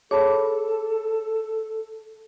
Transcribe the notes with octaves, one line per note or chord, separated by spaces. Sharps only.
G#4 A4 C#5 A5 B5